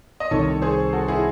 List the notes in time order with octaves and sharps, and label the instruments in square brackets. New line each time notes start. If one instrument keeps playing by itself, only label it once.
[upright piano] D#5
[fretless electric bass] C2 C3 D#3 [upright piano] A4 C#5
[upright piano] G#4 C5
F#4 A4
E4 G#4